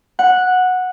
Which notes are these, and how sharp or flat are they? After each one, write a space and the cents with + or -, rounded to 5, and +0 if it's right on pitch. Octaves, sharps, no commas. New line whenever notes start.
F#5 -10